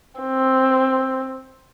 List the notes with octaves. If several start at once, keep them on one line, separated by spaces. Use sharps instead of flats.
C4